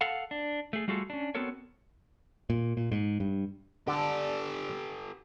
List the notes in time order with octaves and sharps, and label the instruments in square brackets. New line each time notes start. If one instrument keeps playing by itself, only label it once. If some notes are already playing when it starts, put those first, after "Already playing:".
[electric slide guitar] A4 F5 F#5
D4
A3 G#4
G3 A3 F4 F#4 G#4 A4
C#4 D4
B3 C4 F#4 A4 A#4 C#5
[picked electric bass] A#2
A#2
G#2
G2
[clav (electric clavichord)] D3 D4 A5 [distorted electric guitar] G4 A4